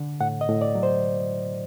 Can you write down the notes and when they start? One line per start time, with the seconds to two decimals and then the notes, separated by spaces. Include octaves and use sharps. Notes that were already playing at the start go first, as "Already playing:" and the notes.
Already playing: D3
0.21 A2 F#5
0.41 D#5
0.48 A2
0.61 D5
0.75 F#3
0.83 C5